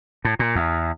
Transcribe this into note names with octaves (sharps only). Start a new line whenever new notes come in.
A2
A#2
E2